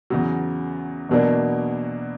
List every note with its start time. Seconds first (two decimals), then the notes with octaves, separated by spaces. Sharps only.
0.10 E2 C#3 F#3
1.09 E2 B2 F#3 A#3 D4